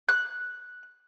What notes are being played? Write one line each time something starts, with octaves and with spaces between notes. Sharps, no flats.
F#6